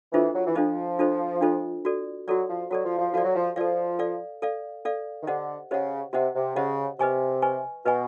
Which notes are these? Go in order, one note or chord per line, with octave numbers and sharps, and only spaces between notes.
E3 D4 F4 A4 C5 D#5
F#3
E3
F3 D4 F4 A4 C5 D#5
D4 F4 A4 C5 D#5
D4 F4 A4 C5 D#5
F#4 A4 D5
F#3 F#4 A4 D5
F3
F#3 F#4 A4 D5
F3
F3
F3 F#4 A4 D5
F#3
F3
F3 A4 D5 F5
A4 D5 F5
A4 D5 F5
A4 D5 F5
D#3
D3 G4 C5 D#5 F#5
C#3 G4 C5 D#5 F#5
C3 G4 C5 D#5 F#5
C3
C#3 G4 C5 D#5 F#5
C3 B4 D#5 G#5 C#6
B4 D#5 G#5 C#6
B2 B4 D#5 G#5 C#6